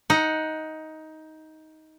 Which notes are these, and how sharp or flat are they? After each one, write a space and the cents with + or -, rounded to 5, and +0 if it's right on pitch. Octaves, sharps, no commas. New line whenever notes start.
D#4 +15 F#5 +0